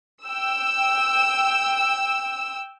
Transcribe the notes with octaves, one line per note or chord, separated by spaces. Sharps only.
G5 E6